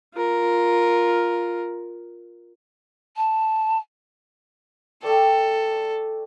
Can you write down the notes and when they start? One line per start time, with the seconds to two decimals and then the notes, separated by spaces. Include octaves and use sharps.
0.14 F4 A#4
3.17 A5
5.03 A3 A4 D5 G5